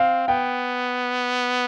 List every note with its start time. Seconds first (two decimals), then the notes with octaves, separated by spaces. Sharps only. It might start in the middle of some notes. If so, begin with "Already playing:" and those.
Already playing: C4 F5
0.27 B3 G5